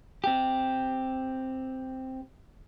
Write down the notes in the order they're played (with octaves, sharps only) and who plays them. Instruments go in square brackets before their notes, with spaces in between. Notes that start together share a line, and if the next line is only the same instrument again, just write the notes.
[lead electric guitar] C4 G4